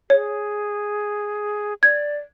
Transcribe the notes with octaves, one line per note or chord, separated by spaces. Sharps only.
G#4 C#5
D5 G#6